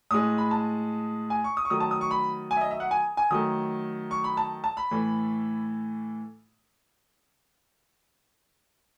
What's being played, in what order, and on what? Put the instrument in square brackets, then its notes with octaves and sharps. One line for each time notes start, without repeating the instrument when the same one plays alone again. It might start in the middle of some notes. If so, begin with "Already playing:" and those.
[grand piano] A2 G#3 D#6
B5
A5
G#5
C#6
D#6
C#6
D#3 F#3 A3 D#6
A5
D#6
C#6
B5
G#5
E5
D#5
E5
F#5
G#5
G#5
D#3 F#3 A3 D#6
C#6
B5
A5
A5
B5
A2 E3 A3